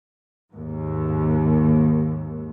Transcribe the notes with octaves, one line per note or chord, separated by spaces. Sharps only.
D#2 G#2